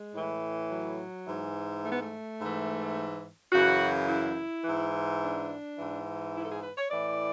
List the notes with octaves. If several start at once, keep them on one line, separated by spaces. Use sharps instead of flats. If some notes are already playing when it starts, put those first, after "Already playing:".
Already playing: G#3
A2 E3
F#3
G#2 E3
A3
B3
A3
G#2 E3
F#2 C#3 E3 F#4
E4
G#2 E3
D4
G#2 E3
E4
A4
G#4
B4
C#5
A2 E3 D5